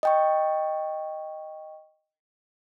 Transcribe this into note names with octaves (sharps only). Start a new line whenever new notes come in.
D#5 G5 C#6